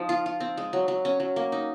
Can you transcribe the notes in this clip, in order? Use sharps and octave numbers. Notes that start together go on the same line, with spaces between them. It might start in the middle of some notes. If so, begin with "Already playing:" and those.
Already playing: F3 D#4
F4
F4
C4
G#3
F#3
F#3
C#4
F#3
A#3
D#4